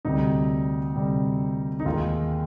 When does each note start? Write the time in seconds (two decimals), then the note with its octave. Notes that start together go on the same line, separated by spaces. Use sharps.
0.05 D2 C3 G3 D#4
0.96 D2 C3 G3
1.80 D#4
1.86 D#2 D#3 G#3 F4